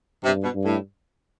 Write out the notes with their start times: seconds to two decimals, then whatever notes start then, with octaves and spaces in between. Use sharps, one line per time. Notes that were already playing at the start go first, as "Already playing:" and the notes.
0.23 G2 C3
0.44 B2
0.55 G2
0.65 A2